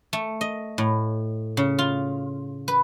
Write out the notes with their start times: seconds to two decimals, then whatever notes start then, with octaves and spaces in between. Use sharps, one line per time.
0.13 A3
0.41 D#5
0.78 A2
1.57 C#3
1.79 F4
2.68 B4